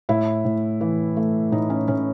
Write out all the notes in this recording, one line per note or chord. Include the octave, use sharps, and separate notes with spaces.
A2 E4
A2
E3
A3
A2 D#4
C#4
A2 C#4